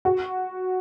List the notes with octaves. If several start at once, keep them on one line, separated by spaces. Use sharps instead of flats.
F#4